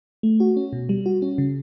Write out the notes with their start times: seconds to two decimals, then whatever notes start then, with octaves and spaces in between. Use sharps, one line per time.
0.23 A3
0.40 F#4
0.57 C#4
0.73 B2
0.89 G3
1.06 F#4
1.22 C#4
1.38 C#3